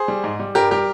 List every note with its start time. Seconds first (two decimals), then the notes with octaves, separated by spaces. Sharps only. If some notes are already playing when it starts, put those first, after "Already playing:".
Already playing: G#4 C5
0.08 G3
0.24 G#2
0.40 G3
0.55 G2 G4 A#4
0.71 G3 G4 A#4